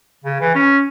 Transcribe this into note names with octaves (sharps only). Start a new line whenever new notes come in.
C#3
E3
C#4